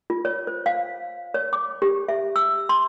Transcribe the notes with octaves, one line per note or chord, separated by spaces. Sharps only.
F4
C#5
C5
F5
C#5
D6
G4
E5
E6
C6